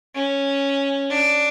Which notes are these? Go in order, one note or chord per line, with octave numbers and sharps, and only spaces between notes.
C#4
D4